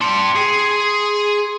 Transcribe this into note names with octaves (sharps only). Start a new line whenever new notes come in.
D4 G5 C6 C#7
G#4